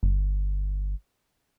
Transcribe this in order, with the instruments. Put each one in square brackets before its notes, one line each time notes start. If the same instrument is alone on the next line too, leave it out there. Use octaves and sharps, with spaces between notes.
[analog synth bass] G1